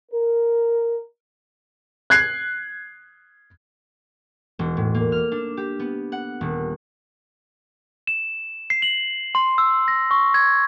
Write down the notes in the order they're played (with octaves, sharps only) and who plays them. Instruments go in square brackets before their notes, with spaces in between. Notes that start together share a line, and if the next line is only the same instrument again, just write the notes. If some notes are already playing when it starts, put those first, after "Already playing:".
[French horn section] A#4
[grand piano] F#6 G#6 C7
[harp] E1
A2
A#3
F6
D4
G4
B3
F#5
D#1
[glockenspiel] E7
C7
F#7
C6
E6
A#6
C#6
G#6